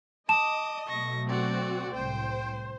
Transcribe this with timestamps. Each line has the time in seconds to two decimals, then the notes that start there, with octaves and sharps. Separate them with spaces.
0.29 D#5 A5 D6 D#6 E7
0.88 B2 F#3 A3 C#6 A#6
1.29 C4 F#4 D5 F#5
1.94 C2 A2 C5 G5